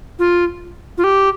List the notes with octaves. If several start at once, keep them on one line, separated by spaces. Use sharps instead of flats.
F4
F4
G4